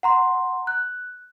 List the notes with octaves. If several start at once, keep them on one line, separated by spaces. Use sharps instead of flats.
F#5 A#5 C6
F#6